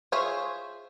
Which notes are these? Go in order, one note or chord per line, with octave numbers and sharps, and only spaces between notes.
F4 G#4 C5 C#5 E5